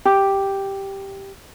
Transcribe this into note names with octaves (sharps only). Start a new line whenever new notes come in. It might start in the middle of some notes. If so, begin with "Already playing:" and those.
G4